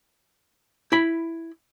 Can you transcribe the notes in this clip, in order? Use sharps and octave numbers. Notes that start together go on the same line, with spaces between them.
E4 B5